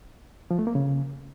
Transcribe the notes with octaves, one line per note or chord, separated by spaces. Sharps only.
F3
A3
A#3
C#3